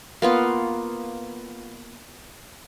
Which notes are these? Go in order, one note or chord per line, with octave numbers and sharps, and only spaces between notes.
A#3 B3 F4